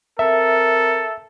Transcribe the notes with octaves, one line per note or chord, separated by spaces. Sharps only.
C4 A4 A#4 E5